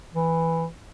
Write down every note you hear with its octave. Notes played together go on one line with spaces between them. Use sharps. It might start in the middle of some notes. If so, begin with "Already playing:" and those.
E3